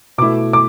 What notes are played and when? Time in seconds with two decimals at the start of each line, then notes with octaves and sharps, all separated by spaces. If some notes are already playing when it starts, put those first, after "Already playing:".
0.18 B2 A3 E4 D6
0.53 D6